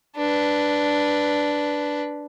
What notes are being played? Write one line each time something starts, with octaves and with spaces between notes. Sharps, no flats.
D4 B4